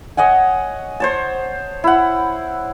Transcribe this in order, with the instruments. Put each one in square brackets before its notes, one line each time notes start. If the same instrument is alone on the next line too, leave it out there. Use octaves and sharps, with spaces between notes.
[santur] C#5 D#5 F#5 G#5
C5 C#5 A5
E4 F#5